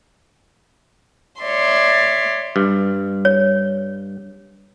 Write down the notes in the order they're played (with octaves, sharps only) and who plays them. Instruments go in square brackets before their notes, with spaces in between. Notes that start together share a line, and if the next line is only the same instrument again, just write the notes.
[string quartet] C#5 D5 E5 C6
[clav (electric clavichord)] G2
[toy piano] C#5